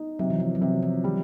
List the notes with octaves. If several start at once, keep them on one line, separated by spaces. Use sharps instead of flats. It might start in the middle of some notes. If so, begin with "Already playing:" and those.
Already playing: D#4
C3 F#3
E3
F3
F#3
C3 F3
F3
D#3 G3